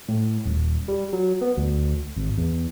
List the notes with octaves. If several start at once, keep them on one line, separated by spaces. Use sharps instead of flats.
A2
D#1
G3
F#3
B3
D2
G#1
E2